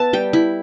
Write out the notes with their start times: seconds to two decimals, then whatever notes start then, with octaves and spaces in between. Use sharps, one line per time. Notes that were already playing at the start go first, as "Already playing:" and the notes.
Already playing: B3 B4 E5 A5
0.13 G3 G5
0.33 E4